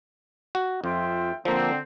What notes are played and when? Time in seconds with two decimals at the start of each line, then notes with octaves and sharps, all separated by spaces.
0.55 F#4
0.84 F2 F4 E5 G5
1.45 D3 F3 A#3 C4